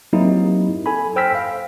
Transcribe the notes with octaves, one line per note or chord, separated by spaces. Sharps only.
F#3 A#3 C4 D#4 E4 G4
A4 G#5 B5
C5 G5 E6 F6 A#6 B6
F5